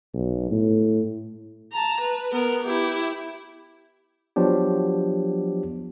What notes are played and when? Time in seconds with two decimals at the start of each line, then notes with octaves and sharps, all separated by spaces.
0.14 B1
0.51 A2
1.72 A5 A#5
2.01 B4
2.33 B3 A#4
2.63 E4 G4
4.36 F3 F#3 B3 D4 G4